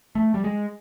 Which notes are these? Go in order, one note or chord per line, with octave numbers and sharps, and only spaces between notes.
A3
G3
G#3